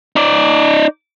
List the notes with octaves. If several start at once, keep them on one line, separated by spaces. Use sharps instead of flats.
D#4 D5